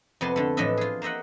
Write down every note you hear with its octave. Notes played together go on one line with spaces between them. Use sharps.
F2 C3 B3 G#5 A5 C6
D3 A3
A2 E3 F3 D4 D#5 E5
F4 G#4
A#3 C5 D#5 E5 F#5